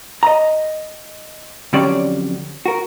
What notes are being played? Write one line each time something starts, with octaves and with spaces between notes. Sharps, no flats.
D#5 A#5
F2 D3 F#3 C#4 G4 D5
F#4 A#4